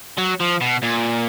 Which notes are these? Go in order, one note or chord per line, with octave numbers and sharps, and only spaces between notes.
F#3
F3
B2
A#2